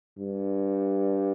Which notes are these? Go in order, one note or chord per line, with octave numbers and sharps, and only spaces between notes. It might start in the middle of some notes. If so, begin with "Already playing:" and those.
G2